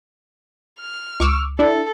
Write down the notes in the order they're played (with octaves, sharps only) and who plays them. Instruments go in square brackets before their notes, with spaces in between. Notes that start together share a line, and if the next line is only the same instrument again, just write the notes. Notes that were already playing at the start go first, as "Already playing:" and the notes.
[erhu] F6
[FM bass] C#2 [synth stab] C#6 D6 E6
[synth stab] D4 E4 [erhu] A4